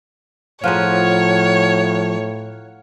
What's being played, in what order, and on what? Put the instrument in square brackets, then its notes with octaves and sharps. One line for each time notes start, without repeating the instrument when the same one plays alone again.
[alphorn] A2 [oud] F3 G#4 [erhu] C#5 [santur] F5 F#5 A#5